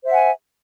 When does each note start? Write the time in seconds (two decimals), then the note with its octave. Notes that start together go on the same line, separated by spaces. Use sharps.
0.03 C5
0.07 E5
0.11 F#5
0.14 G#5